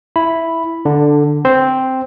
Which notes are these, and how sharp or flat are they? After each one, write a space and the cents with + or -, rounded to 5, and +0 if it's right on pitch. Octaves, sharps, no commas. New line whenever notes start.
E4 +0 B5 +0
D3 +0 D4 +15
C4 +0 C5 +0